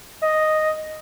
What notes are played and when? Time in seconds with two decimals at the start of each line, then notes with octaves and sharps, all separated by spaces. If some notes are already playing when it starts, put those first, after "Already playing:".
0.22 D#5